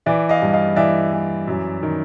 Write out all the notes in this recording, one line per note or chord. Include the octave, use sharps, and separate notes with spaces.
E3 D5 E5
D#5 F5
G2
D#5 F5
E3 D5 E5
E3
F#2
D#3